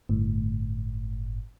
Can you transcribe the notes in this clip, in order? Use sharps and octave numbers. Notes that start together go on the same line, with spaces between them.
G1 A2